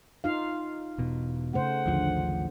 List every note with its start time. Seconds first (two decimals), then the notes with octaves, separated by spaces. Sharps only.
0.24 D#4 F4 F5
0.98 E1 B2
1.53 C#3 A3 C5 F#5
1.86 A1 D#2 D3 F3